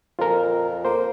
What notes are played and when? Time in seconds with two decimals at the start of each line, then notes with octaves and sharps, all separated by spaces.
0.19 F2 F4 A#4
0.85 A#3 C5